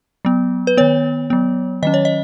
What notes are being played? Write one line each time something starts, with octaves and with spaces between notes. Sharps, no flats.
F#3 B3
B4
D#3 B3 C#5
F#3 B3
D#3 F#3 C#4 D#5
C#5
D#5